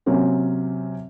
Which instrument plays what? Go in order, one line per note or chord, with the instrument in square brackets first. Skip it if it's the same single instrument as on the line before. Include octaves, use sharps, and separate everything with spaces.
[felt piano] C3 F#3 A#3 C4 C#4